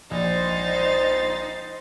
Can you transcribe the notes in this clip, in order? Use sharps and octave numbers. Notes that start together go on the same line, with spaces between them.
A#1 D#4 C5 A6